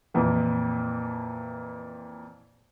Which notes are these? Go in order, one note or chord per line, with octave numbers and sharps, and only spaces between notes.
F2 A#2 E3 F3